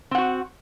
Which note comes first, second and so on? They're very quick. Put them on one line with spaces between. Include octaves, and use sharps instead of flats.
C4 F#5 F#4